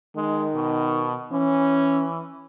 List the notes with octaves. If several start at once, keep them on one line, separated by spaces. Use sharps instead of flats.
D#3 G#3
B2
E3 C#4